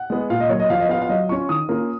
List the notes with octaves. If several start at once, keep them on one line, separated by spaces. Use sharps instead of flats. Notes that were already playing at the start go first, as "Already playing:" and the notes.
Already playing: F#5
G#3 B3
A#2 F5
D#5
F#3 A#3 C#5
D#5
F3 F5
D#5
B3 F5
F4
F5
F#3 D#5
C#4 F4 C#6
D#3 D#6
A#3 C#4 F4